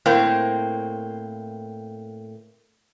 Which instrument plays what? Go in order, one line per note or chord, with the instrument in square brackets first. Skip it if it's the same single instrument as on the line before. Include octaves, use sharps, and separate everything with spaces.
[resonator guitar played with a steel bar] A2 A#3 C4